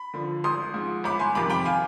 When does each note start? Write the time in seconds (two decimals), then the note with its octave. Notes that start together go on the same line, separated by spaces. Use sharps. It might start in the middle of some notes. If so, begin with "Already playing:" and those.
Already playing: B5
0.14 D3 F3
0.44 G#1 C6 D#6
0.74 G#2 F3
1.04 G1 B5 D6
1.19 G#5 C6
1.35 F2 C3 D#3 B5 D6
1.50 G5 B5
1.65 F5 G#5